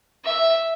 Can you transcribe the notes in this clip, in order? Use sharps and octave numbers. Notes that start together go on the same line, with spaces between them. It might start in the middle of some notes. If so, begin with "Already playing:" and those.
E5